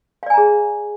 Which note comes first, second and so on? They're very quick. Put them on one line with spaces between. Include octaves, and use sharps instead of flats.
F5 D5 G#5 A#5 G#4